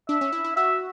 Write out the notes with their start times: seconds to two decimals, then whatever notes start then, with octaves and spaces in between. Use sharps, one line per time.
0.09 D4 E5
0.21 C#4
0.32 E4
0.44 E4
0.56 F#4 E5